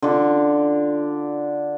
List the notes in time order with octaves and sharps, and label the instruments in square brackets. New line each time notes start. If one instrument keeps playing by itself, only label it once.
[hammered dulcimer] D3 F4 D6